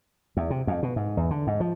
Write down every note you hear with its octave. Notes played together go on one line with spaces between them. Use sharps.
E2
C3
F2
B2
G#2
E2
D3
G#2
F3